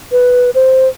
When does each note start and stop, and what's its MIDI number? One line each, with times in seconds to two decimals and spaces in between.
0.12 0.50 71
0.55 0.88 72